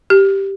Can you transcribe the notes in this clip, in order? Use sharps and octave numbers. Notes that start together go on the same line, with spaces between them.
G4